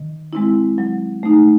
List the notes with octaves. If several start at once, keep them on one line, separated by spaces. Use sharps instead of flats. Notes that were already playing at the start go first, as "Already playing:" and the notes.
Already playing: D#3
G#3 C4 E4
F#3
A3 D#4